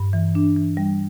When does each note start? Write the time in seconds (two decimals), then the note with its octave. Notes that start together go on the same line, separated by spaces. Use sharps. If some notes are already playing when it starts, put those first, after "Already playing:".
Already playing: G2
0.13 E3
0.35 D4
0.56 E3
0.77 G3